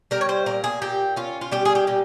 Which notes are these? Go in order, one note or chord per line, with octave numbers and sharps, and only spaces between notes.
G3 A#4
C#5
C5
A#2 A#4
G#4
A#2 G4
C#4 F4
F4
G3 G4
G#4
G4
A#2 G4